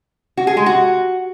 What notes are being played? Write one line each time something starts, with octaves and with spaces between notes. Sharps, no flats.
F#4
G#4
G#3
F#4